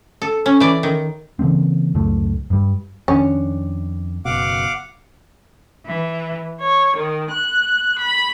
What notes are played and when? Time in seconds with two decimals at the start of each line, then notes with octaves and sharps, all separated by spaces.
0.22 A4
0.46 C#4
0.60 E3 D5
0.83 D#3
1.39 C#3 E3 A#3 C4
1.95 C#2 F#2 A2 A3
2.50 G2 G3
3.08 F2 D#3 C#4 D4
4.25 F#1 B2 F5 F#5 D6
5.86 E3
6.59 C#5
6.95 D#3
7.30 F#6
7.97 B5